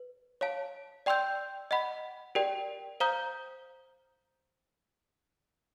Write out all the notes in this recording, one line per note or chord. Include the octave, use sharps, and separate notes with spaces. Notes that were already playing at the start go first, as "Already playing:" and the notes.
Already playing: B4
C#5 F5 A5
D5 G5 C6 E6 G6
D#5 F#5 B5
G4 A#4 D5 G5
C5 F5 A#5 D#6 G6